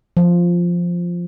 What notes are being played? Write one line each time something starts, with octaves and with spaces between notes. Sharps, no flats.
F3